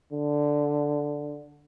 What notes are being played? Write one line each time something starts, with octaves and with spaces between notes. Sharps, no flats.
D3